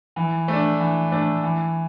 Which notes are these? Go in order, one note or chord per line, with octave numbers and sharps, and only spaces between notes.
E3
A3
D4
E3
A3 D4
E3